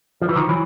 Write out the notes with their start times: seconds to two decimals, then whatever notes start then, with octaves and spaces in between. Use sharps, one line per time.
0.22 F3
0.29 E3
0.36 D#3 F3
0.49 E3 F#3